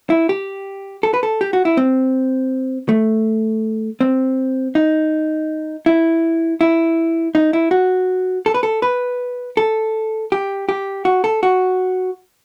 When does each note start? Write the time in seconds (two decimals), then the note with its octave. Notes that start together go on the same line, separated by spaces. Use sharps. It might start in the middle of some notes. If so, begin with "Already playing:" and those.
0.10 E4
0.29 G4
1.03 A4
1.14 B4
1.23 A4
1.41 G4
1.53 F#4
1.65 E4
1.77 C4
2.89 A3
4.01 C4
4.75 D#4
5.86 E4
6.61 E4
7.35 D#4
7.53 E4
7.71 F#4
8.46 A4
8.54 B4
8.63 A4
8.82 B4
9.57 A4
10.32 G4
10.69 G4
11.05 F#4
11.24 A4
11.43 F#4